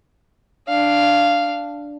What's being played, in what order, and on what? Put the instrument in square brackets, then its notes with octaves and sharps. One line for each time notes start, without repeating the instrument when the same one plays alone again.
[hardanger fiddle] D4 F5